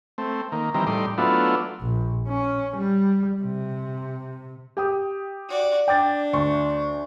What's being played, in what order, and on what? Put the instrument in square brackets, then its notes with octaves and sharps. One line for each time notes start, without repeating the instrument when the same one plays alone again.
[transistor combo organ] A3 C4
D#3 A#3
D#3 E3 G3 C4 A#4
A2 G3 D#4 D5 C6
F#3 A3 B3 D4 E4 F4
[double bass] A#1
C#4
G3
C3
[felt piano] G4 G5 D#6
[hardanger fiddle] F#4 D5
[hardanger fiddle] D4 [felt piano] G5 D6 A6
[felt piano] D2 C6 C#6